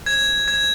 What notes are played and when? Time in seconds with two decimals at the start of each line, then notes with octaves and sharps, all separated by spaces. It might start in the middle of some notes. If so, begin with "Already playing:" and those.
0.06 G#6
0.48 G#6